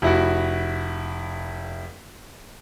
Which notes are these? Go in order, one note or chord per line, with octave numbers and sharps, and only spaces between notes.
F1 E4 F#4